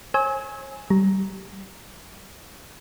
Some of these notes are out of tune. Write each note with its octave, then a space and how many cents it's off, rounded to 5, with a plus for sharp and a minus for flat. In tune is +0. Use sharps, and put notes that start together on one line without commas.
C#5 -45 G#5 +0 E6 -35
G3 -30 A#5 +0